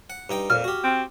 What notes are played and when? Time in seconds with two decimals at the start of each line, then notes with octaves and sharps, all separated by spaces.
0.10 F#5
0.30 G2 D#4 G5
0.50 F2 A#2 F6
0.64 F#4 G4
0.84 C4